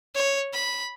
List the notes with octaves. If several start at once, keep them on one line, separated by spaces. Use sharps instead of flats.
C#5
B5